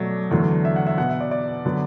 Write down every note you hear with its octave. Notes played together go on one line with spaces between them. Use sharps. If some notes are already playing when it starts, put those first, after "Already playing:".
Already playing: B2 F#3 A3 D5
E2 D3 F#3 A3
E5
F#5
E5
B2 B3 F#5
E5
D5
D5
D3 F#3 B3